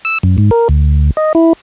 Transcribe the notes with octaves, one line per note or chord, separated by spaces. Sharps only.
E6
F#2
G#2
A#4
D2
D#5
E4